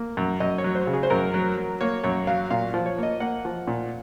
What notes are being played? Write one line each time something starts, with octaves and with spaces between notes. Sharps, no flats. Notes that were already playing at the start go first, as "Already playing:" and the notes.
Already playing: A#3
F#2
F#2 D#5
C#5
F#3
C5
C#3
G#4
C5
F#2 A#4
F#3
F#3
A#3 C#5
F#2 C#5
F#3 F5
A#2 F5
F3
C#5
A#3 D#5
A#3 F#5
F3
A#2